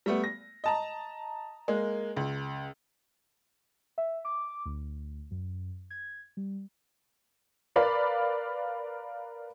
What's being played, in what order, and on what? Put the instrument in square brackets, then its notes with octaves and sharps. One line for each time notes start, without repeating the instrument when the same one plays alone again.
[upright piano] G3 A3 B3
A#6
D#5 A5 A#5
G#3 A#3
C#2
[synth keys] E5
D6
D2
F#2
G#6
G3
[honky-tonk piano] A#4 B4 D5 F5 B5